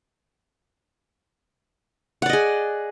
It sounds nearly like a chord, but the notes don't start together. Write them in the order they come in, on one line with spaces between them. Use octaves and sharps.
F#5 D5 D#5 G#4